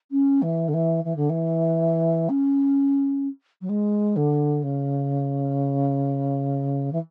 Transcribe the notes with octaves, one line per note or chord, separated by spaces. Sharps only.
C#4
E3
D3
E3
E3
D3
E3
C#4
F#3
G#3
D3
C#3
E3